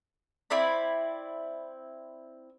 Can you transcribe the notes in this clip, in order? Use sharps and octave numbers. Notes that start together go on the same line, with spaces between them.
C4 E4 D5 B5